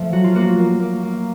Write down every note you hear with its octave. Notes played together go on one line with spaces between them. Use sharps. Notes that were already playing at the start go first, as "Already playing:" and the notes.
Already playing: F3 A3
F#3 F#4
F4
A#3 F#4
A#3
A#3
A#3